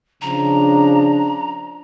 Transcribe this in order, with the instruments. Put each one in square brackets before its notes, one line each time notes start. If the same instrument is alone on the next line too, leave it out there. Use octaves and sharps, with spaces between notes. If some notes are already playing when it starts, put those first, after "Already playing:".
[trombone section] C#3 F3 D4 [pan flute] A#5